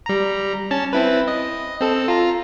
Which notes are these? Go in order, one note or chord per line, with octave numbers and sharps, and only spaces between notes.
G3 A#5
C#4 A5 A6
C4 E4 B4
D#5
C4 A4
F4 A#5